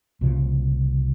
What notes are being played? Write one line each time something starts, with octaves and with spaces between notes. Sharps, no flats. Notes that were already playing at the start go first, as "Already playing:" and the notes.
C2 A#2 C#3 F3